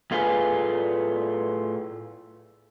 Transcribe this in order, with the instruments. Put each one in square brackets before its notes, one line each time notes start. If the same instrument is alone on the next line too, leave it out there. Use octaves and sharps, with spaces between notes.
[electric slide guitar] A2 A3 F4 G#4 B4 G#5